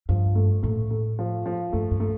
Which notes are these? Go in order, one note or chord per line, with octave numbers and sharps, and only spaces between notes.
G2 F3
A3
A2 A3
A3
F3
F3
G2 A3
G2
A3